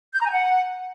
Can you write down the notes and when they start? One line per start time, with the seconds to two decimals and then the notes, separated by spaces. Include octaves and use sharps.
0.14 G6
0.20 A#5
0.26 G#5
0.31 F#5